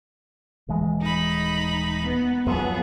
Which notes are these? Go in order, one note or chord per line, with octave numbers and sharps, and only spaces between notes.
D#1 E3 G#3
D#4 B5
B3
F#2 F3 B3 G#4